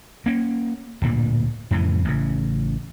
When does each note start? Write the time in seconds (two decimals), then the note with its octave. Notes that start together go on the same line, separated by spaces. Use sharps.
0.26 A#3 C#4
1.02 D1 G2 A#2
1.71 F2 A2 C#3 E3
2.05 A1 C#3